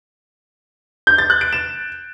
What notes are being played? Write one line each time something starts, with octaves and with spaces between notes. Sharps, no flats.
G6
A6
F#6
D7
E7